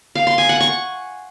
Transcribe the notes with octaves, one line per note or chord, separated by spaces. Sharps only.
F5
C6
G#5
F#5
C#6